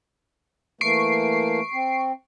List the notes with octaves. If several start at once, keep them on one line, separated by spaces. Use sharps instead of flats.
E3 A3 A#3 C#6 C7 D7
C4